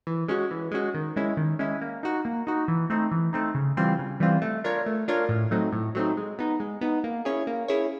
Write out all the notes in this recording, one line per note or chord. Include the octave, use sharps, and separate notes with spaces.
E3
G#3 C#4 F#4
E3
G#3 C#4 F#4
D#3
G#3 C#4 E4
D#3
G#3 C#4 E4
A#3
D#4 F#4
A#3
D#4 F#4
E3
A3 C4 D#4
E3
A3 C4 D#4
C#3
E3 G3 C4 F4
C#3
E3 G3 C4 F4
A3
D4 F4 A#4 C#5
A3
D4 F4 A#4 C#5
A2
F#3 A3 C4 D#4
A2
F#3 A3 C4 D#4
G#3
B3 D#4
G#3
B3 D#4
A#3
C#4 E4 G#4 C#5
A#3
C#4 E4 G#4 C#5